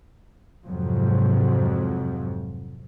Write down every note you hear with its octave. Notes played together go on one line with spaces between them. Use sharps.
F2 G#2 C3 F3 F#3